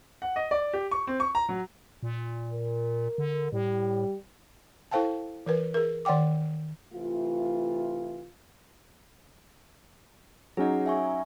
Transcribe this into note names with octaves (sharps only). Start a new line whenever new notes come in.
F#5
D#5
D5
G4
C#6
C4
C#6
A#5
F#3
A#2
A#4
D3
A2 G3
E4 A4 C5 F5 G5 A5
E3 A#4 B4
G#4 A#4
D#3 D5 F#5 G5 D6
C3 E3 A3 F4
F#3 C#4 D#4 G#4 F#5
E5 G#5 C#6